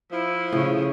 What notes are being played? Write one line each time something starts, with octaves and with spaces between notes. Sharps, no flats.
F3 E4
A2 C#3